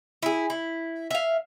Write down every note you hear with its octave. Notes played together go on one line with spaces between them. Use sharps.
E4 G#4
E4
E5 F5